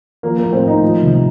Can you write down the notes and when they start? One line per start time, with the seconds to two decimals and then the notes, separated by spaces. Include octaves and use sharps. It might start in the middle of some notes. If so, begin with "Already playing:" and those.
0.23 F3 A#3
0.38 A2 A#3
0.53 C4
0.63 A2 D#4
0.82 F3
1.02 C3